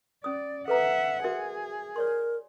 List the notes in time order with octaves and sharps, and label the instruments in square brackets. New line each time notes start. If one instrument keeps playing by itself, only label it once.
[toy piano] C#4 D#6 [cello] D5
[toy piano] A4 B4 A#5 [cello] E5 F#5
[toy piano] F#4 A#4 E5 [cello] G#4
[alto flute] A#4 [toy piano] C#5 D5 C6